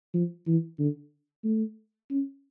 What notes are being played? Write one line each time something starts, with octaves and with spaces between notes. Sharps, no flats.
F3
E3
D3
A3
C#4